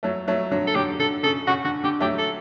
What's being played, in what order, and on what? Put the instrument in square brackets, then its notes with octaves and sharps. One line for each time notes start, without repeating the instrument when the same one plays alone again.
[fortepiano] F#3 A3
F#3 A3
D3 F#3
[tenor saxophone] A4
[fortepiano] D3 F#3 [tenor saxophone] G4
[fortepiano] D3 [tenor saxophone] A4
[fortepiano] C#3 [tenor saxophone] A4
[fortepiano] C#3 [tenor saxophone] F#4
[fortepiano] D3 [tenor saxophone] F#4
[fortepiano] D3 [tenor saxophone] G4
[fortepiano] F#3 A3 [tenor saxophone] G4
[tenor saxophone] A4